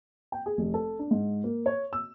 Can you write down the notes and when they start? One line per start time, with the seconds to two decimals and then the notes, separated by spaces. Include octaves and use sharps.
0.32 G5
0.46 G#4
0.58 F1
0.74 A4
0.99 D4
1.11 G#2
1.44 A#3
1.66 C#5
1.93 E6